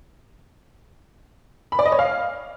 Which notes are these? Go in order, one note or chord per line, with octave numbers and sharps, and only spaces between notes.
B5
D5
D#5
C#5
F5